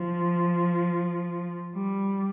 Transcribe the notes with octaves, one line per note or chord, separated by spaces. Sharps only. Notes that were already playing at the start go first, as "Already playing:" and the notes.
Already playing: F3
G3